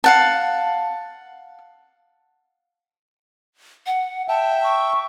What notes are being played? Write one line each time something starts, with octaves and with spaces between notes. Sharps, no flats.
F5 F#5 A5
F#5
E5 G5 A5
C#6